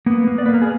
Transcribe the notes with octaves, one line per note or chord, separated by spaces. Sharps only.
A#3 B3
A#3
D5
A#3 B4
A#4
G#4